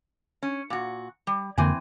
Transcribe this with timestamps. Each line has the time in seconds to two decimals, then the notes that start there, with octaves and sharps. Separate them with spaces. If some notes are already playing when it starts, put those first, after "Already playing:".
0.43 C#4
0.70 A#2 F#4
1.27 G3
1.58 F2 D3 E3 A#3 C4 G#5